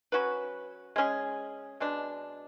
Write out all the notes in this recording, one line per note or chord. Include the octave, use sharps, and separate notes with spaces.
F#3 C#4 F#4 B4
G#3 C#4 G#4
B2 G#3 D4